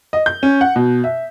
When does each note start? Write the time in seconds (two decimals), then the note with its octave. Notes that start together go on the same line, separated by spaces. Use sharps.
0.13 D#5
0.26 G6
0.43 C#4
0.61 F#5
0.76 B2
1.04 E5